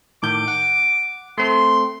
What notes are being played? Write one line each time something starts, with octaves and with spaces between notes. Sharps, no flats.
A2 D#3 D6 G6
F#5
A3 C4 C6